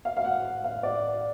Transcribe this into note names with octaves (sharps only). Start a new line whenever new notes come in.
F5
F5
F#5
F5
D5